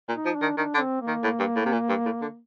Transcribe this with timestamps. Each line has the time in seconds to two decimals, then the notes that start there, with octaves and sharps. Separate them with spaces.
0.08 A#2
0.14 D#4
0.25 F3
0.36 D4
0.42 D#3
0.57 D#3 D4
0.74 D3
0.80 C4
1.01 A#3
1.07 D#3
1.23 A2
1.39 G2
1.56 A2
1.66 C3
1.72 A#2
1.89 G2
2.05 A2
2.21 D3